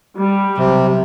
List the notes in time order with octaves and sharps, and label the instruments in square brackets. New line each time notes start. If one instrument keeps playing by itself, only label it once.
[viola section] G3
[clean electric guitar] B1 [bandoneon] C3